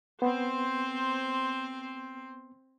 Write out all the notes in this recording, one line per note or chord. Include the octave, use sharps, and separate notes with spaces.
B3 C4 C5